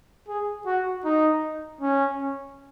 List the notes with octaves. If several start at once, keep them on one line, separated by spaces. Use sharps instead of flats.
G#4
F#4
D#4
C#4